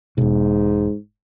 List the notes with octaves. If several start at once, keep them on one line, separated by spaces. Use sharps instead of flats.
E1 G#2 B2